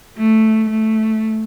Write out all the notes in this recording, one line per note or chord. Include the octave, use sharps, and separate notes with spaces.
A3
A3